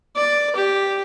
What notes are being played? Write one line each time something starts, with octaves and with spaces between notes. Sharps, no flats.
D5
G4